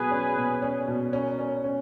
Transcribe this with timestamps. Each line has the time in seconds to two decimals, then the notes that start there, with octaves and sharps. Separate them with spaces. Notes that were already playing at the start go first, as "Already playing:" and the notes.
Already playing: B2 F#3 G#4 B4
0.11 C#4
0.37 B2
0.62 C#4
0.88 B2
1.13 C#4 A#4 C#5
1.39 C#4
1.64 C#4